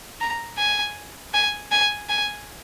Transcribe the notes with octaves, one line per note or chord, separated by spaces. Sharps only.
A#5
G#5
G#5
G#5
G#5